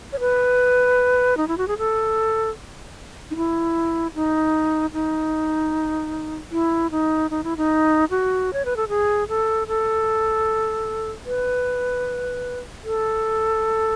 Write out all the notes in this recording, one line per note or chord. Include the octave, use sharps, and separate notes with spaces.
C#5
B4
D#4
E4
F#4
G#4
A4
D#4
E4
D#4
D#4
E4
D#4
D#4
E4
D#4
F#4
C#5
B4
A4
G#4
A4
A4
B4
A4